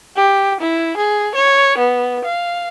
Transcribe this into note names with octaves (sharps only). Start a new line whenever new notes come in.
G4
E4
G#4
C#5
B3
F5